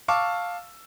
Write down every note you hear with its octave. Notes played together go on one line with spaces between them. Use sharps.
F5 A5 C#6 D6 E6